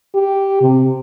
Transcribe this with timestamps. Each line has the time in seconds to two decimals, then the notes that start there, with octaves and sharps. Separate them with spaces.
0.15 G4
0.61 C3